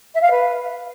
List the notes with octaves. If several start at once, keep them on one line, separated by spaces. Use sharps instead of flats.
E5
F5
B4